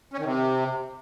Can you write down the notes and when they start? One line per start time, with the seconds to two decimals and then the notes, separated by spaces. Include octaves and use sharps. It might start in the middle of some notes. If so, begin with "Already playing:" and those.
0.14 C#4
0.19 D#3
0.24 C3